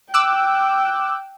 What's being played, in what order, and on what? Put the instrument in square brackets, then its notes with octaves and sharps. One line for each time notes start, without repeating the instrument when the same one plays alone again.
[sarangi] G5 [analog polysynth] D6 E6 F#6